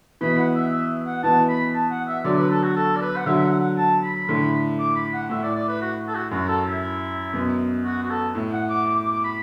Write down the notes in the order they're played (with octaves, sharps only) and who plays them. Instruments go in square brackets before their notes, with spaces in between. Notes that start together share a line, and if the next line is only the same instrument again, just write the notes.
[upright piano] B2 E3 [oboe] B5
[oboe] F#5
E5
E5
F#5
[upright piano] B2 E3 [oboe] A5
[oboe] B5
A5
F#5
E5
[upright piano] D3 F#3 [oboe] D5
[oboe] B4
A4
F#4
A4
D5
B4
F#5
[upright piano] D3 F#3 [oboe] E5
[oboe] F#5
F#5
A5
B5
[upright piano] A2 D3
[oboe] D6
B5
F#5
[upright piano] A2 [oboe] E5
[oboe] D5
D5
B4
F#4
A4
F#4
[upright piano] F#2 [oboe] F#4
[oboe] A4
E4
[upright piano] F#2 B2
[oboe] F#4
F#4
A4
[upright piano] A2
[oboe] F#5
D6
D6
D6
D6
B5